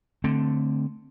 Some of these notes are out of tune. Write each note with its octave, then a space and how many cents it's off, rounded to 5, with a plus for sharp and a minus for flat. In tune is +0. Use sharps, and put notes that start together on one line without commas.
D3 +0 A3 +0 C4 +0